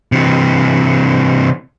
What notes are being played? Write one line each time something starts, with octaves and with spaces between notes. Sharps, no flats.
C3 E3